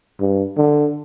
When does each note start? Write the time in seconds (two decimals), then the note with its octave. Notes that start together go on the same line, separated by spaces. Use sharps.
0.20 G2
0.57 D3